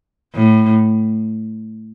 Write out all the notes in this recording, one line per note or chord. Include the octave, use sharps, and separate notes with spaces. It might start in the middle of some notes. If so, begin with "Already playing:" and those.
A2